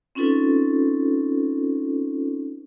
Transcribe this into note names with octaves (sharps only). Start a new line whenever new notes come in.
C4 C#4 D#4 F4 A4 B4